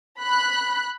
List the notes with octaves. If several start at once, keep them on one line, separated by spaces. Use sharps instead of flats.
B5 F#6